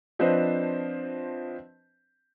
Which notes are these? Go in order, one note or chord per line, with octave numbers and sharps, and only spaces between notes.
F3 C4 D4 B4 C5 D#5